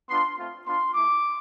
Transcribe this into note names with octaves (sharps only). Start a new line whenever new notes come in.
B3 D4 F4 C6
A3 C4 F4
B3 D4 F4 C6
A3 E4 D6